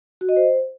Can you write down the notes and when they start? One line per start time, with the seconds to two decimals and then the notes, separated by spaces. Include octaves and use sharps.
0.21 F#4
0.29 D#5
0.36 C5